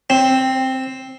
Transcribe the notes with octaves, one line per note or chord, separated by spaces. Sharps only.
C4